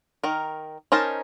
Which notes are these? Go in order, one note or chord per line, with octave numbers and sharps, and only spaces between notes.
D#3 A#4
C#4 D#4 A#4 C5 A5